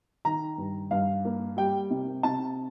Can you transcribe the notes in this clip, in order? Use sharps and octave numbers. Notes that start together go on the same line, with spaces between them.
D#3 A#5
G2
G2 F5
A#3
G3 G5
C3
C3 A5